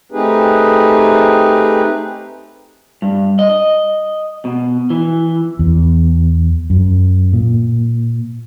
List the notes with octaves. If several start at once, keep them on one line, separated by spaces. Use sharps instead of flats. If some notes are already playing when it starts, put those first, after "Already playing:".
A3 C4 D#4 G4 G#4 B4
G2
D#5
B2
E3
E2
F#2
A#2